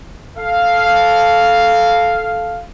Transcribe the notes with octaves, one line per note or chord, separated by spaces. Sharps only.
A4 F5